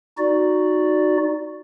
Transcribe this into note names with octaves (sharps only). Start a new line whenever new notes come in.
D#4 F#4 D5